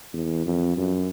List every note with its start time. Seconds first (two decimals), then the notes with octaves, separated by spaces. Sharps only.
0.13 E2
0.45 F2
0.77 F#2